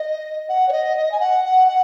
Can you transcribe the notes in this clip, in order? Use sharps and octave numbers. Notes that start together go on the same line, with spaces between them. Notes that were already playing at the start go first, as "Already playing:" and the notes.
Already playing: D#5
F#5
C#5
D#5
D#5
G#5
F#5
F#5
F#5